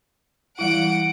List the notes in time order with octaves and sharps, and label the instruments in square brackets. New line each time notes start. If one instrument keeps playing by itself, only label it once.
[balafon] E3 G3 E4 [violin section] F#5 D7